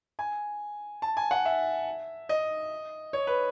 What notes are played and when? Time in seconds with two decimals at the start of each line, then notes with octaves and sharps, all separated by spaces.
0.19 G#5
1.02 A5
1.17 G#5
1.31 F#5
1.45 E5
2.29 D#5
3.13 C#5
3.27 B4